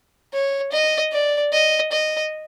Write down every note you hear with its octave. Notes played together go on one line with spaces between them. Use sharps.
C#5
D#5
D5
D#5
D#5